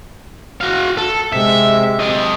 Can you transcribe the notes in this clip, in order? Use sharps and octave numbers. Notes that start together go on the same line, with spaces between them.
F#4 F5
A4
C3 G#3 E5
A4 D#5